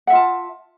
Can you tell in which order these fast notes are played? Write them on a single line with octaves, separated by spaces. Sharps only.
F#5 E5 F4 A5